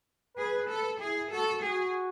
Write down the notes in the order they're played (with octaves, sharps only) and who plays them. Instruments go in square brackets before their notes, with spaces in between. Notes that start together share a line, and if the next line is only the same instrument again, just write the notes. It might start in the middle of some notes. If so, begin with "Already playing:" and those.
[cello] G#4 [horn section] B4
[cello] A4
[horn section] E4 [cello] G#4
[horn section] F#4 [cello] A4
[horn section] F#4 [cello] G#4